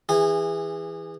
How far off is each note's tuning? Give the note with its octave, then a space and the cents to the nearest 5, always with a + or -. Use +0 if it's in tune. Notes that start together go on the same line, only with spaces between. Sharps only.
E3 +0 G#4 -30 G#5 +0